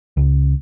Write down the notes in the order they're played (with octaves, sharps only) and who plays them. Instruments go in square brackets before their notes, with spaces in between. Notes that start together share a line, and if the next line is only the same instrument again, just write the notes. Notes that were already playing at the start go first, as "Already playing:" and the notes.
[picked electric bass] C#2